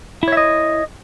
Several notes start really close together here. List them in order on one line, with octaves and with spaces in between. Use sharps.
E4 C#5 E5 D#5